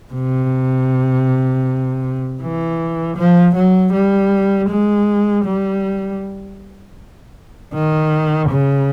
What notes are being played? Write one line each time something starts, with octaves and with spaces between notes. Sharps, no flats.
C3
E3
F3
F#3
G3
G#3
G3
D#3
C#3